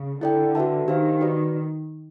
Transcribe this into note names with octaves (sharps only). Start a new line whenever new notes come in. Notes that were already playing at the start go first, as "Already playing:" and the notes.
Already playing: C#3
D3 E4 A4 D5 G5
F#4 B4 E5 A5
D#3 D4 G4 C5 F5
F#4 B4 D5